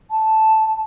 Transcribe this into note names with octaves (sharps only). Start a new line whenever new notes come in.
A5